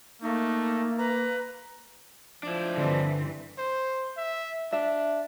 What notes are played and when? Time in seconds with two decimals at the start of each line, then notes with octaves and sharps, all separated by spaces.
0.22 A3 A#3 D#4
0.98 B4 A#5
2.43 F3 D4 E4
2.77 G2 D3 E3 C4
3.58 C5
4.17 E5
4.72 D4 E5